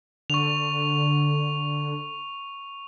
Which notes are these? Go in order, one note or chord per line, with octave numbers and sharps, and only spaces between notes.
D3 C#6 F7